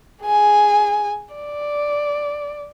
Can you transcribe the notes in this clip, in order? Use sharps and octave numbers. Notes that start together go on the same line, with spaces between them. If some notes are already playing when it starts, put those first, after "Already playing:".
G#4 G#5
D5